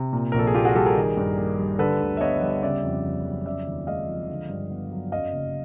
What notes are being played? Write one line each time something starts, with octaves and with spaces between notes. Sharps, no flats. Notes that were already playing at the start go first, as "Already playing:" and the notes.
Already playing: C3
A#2
A#1 A#4
A4
G#4
A#1 F4 G4
F#4 G#4
G3 G4 A4
G#4 A#4
D#3
G2
A#3
G3
D3 A4 B4
D2
E5
B3 C#5 D#5
G3
C#3 D5 E5
F2
F2
F#3
C#3 D5 E5
D#2
G#3 D#5 F5
F3
D3
G2
B3
F#3
F#2 D#5 F5
F#1